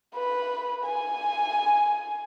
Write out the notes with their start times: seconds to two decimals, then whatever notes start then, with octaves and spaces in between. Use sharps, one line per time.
0.15 B4
0.85 G#5